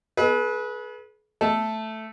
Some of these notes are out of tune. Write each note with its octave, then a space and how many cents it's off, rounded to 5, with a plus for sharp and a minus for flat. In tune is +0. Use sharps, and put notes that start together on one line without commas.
G#4 +40 B4 -20
A3 +0 A4 +0